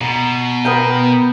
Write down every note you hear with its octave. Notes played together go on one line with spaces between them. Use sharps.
B2 A#5
B3 A#4 G5